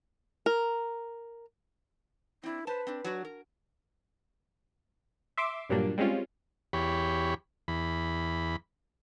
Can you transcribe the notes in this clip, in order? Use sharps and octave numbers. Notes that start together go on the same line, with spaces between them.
A#4
C4 D4 E4
B4 C5 A5
C4 D4
F#3 D4 F#4
A#4
E5 C6 D6
G2 A#2 F#3 G3 A#3 D4
G3 G#3 C4 C#4 F4
E2 G4 C#5 B5
E2 B5